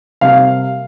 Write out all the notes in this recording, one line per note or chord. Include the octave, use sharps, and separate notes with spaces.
C3 G3 A#3 F5